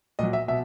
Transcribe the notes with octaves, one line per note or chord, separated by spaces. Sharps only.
A#2 F#3 D#5
E5
B2 E5